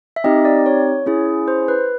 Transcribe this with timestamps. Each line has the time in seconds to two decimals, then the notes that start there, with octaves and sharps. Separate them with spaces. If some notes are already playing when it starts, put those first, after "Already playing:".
0.16 E5
0.24 C4 D#4 G4 D#5
0.45 D5
0.66 C#5
1.06 C#4 E4 G#4
1.48 C5
1.68 B4